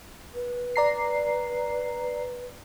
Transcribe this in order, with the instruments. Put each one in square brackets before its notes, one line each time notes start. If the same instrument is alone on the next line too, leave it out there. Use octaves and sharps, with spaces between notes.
[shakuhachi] B4
[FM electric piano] D5 A#5 C7